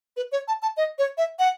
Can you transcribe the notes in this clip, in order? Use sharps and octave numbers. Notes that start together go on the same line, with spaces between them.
B4
C#5
A5
A5
D#5
C#5
E5
F#5